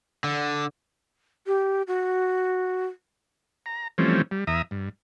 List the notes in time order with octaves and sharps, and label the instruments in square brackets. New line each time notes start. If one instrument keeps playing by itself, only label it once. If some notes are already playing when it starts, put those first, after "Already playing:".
[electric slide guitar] D3
[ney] G4
F#4
[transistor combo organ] A#5
E3 F3 G3 A3 C4 C#4
G3
E2 E5 A#5 D#6
G2